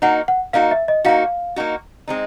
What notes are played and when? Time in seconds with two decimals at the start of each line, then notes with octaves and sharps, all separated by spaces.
0.02 A#3 D#4 F#4 F#5
0.28 F#5
0.53 A#3 D#4 F#4 F5
0.71 E5
0.88 D#5
1.05 A#3 D#4 F#4 F5
1.56 A#3 D#4 F#4
2.08 G#3 C4 D#4